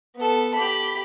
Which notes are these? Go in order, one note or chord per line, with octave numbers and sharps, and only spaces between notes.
B3 A4
G4 B5